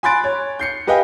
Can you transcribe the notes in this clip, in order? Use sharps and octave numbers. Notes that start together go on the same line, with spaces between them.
G#5 B5 C6 F#6 A6 D7
C#5
G6 C7 C#7
G4 B4 D#5 F5 G5 G#5